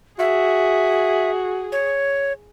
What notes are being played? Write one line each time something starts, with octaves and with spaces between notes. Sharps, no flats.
F#4 G#4 E5
C#5